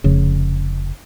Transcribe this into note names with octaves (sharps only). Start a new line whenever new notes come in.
F1 C#3